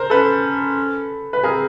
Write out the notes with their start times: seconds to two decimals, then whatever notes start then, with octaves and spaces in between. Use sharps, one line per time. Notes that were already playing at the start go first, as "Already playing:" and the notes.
Already playing: A#4 C5
0.10 C#4 A4 B4
1.33 B4
1.43 C4 G#4 A#4